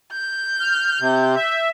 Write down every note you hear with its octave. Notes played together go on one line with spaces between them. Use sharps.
G6
F6
C3
E5